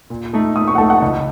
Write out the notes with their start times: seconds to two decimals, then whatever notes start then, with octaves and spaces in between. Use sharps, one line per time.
0.10 A#2
0.33 A3 D#4 A4
0.55 A#2 D#6
0.68 C#6
0.75 F#5
0.78 A3 D#4 A4 A5
0.90 F#5
1.02 C#2 D#5